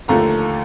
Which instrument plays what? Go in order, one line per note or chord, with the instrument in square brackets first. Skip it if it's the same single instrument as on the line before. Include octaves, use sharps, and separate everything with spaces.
[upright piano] D#2 D3 F3 A3 A#5